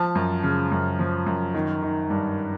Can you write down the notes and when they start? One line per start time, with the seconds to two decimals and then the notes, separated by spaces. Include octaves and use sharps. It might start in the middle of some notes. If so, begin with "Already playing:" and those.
Already playing: F3 A5
0.15 F#2
0.43 C#3
0.72 F#2
0.99 F3
1.26 F#2
1.54 D#3
1.82 D#3
2.10 G2